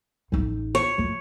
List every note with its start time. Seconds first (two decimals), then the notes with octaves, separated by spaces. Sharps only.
0.32 A1 D#4
0.75 C#5
0.98 A3 F4